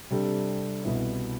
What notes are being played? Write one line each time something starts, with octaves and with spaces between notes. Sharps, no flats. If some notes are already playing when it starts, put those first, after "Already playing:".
C3 G3 D4 A4
C2 B2 B3 E4